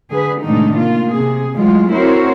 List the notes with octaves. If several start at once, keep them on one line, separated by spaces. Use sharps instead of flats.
D3 G#4 B4
A2 C3 D#3 G#3 D4 D#4
A#3 F4
C3 G#4
E3 F#3 G#3 A3 F4
C4 E4 F#4 A#4 C5 C#5